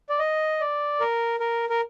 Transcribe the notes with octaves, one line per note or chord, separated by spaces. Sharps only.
D5
D#5
D5
A#4
A#4
A#4